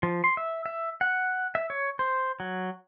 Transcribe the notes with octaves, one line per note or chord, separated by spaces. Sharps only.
F3
C6
E5
E5
F#5
E5
C#5
C5
F#3